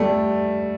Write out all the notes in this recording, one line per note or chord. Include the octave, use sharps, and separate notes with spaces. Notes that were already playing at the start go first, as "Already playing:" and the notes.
Already playing: G3 A3